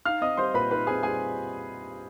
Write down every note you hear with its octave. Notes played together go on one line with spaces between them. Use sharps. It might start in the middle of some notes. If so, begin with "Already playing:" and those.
D#4 F5 F6
C4 D#5 D#6
G3 C5 C6
A#2 B4 B5
D#4 B4 B5
C4 G#4 G#5
G3 G#4 G#5